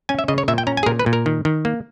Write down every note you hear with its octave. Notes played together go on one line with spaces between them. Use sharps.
C#4 G#5
E5
C#3 D#5
C#5
A#2 E5
G5
C#4 A#5
G#5
G#4
A#2 A#4
B4
A#2
A#4
D#3
D#3
A#3